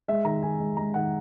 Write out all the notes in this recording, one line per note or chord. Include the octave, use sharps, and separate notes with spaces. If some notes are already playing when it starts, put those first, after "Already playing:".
G#3 E5
D#3 A#5
D#3 G#5
G#3
G#3 A#5
D#3 F#5